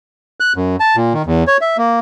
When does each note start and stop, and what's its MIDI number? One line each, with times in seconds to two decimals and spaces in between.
0.40 0.53 90
0.56 0.76 42
0.80 0.96 81
0.96 1.13 46
1.14 1.22 51
1.26 1.43 40
1.47 1.57 73
1.61 1.77 76
1.78 2.00 58